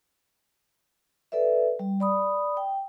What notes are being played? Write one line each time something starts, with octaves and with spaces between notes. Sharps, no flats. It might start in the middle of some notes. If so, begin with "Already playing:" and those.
A4 B4 D5 E5
G3
D5 B5 D#6
G5